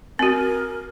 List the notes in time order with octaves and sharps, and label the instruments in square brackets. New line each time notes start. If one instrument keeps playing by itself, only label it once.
[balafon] C4 F#4 [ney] A#4